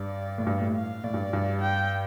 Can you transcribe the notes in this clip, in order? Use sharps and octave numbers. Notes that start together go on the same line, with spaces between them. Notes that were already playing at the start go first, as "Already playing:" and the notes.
Already playing: G2 D5
A2
G2
A2
F5
A2 D5
G2
G2
G5